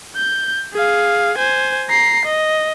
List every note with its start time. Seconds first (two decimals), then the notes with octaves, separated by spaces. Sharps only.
0.16 G6
0.73 G#4 F5
1.38 C5 G#5
1.90 A#5 C7
2.25 D#5